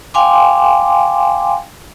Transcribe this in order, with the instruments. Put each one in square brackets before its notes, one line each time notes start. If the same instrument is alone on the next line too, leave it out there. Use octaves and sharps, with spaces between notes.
[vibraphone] F5 G5 G#5 C6 D6